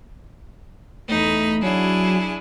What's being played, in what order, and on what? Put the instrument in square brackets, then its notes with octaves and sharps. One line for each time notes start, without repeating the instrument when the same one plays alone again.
[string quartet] E2 D#4 B5 [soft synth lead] A3
[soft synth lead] F#3 [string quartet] D4 E4 G#4